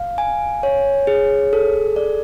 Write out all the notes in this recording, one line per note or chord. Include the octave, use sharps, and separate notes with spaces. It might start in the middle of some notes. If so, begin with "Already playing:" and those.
Already playing: F5
G#5
C#5
G#4
A4
D5